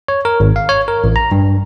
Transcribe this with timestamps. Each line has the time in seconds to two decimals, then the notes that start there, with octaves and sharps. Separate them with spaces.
0.08 C#5
0.25 A#4
0.40 G#1
0.56 F5
0.69 C#5
0.88 A#4
1.04 A1
1.16 A#5
1.32 G2